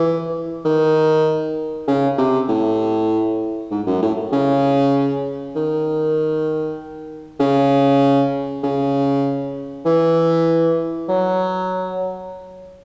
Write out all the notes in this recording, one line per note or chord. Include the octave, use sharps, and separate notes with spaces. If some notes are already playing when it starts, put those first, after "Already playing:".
Already playing: E3
D#3
C#3
C3
A2
G#2
F#2
A2
C#3
D#3
C#3
C#3
E3
F#3